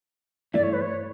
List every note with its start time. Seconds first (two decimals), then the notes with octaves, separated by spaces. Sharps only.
0.54 G2 E3 A3 E4 D5
0.63 C#5
0.73 B4
0.81 C#5